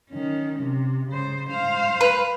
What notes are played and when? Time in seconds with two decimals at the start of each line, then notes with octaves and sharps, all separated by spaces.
0.10 D#3 C#4
0.63 C3
1.10 C#3 C5
1.49 C5 F5
2.01 B4